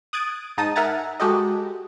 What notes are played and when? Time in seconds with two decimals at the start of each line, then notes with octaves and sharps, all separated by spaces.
0.13 D#6 F#6 G#6 A6 D7
0.57 G#2 D#4 A5 D#6
0.76 A#4 E5 F#5 G#5 A#5 A6
1.20 G#3 F#4 G4 A4 D#5